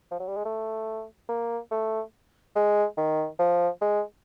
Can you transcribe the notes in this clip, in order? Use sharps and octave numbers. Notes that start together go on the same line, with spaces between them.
F3
F#3
G3
G#3
A3
A#3
A3
G#3
D#3
F3
G#3